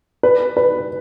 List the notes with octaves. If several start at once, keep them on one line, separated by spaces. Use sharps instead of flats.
B4
B4